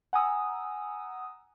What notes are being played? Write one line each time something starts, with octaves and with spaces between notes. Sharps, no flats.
F#5 G#5 A#5 D#6 E6